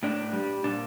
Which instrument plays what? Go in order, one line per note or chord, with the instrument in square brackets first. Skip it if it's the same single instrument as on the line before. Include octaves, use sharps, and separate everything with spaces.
[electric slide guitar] A2 D4
G3
A#2 D4